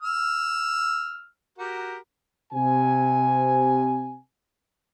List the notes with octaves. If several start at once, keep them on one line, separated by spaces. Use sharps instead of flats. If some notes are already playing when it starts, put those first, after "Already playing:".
E6 F6
F#4 G4 A#4
C3 G#5